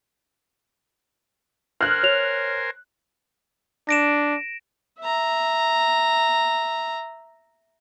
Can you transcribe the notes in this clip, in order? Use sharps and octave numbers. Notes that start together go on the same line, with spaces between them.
A#4 C5 G#5 F6 F#6
C#5 F7
D4 A#6 D7 E7
E5 A#5